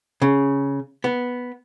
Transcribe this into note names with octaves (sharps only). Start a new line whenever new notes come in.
C#3
B3